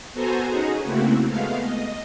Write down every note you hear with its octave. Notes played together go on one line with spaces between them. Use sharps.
B3 F#4 A4 C5 G#5 A#5
C#4 D#4 F#4 G#4
C#3 A3 A#3 C4 E4 F#4
G#3 A3 B3 F5
D#5